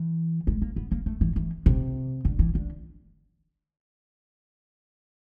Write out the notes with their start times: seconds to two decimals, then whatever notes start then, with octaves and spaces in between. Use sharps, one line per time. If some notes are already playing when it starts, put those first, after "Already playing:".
Already playing: E3
0.47 G#3
0.62 A#3
0.76 B3
0.92 A#3
1.06 A3
1.21 E3
1.36 E3
1.66 C3
2.25 D3
2.39 E3
2.55 D3